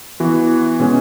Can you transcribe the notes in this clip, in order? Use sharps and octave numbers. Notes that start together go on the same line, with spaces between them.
E3 B3 F#4
B2 G#3 C#4